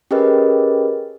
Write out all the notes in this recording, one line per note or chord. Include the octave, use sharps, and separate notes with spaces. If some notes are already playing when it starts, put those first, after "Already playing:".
C#4 G4 G#4 A#4 B4 D#5